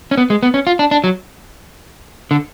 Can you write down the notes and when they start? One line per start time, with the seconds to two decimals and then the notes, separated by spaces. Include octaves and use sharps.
0.11 C#4
0.17 B3
0.30 G#3
0.43 B3
0.54 C#4
0.67 F4
0.79 D4
0.91 D4
1.04 F#3
2.31 D3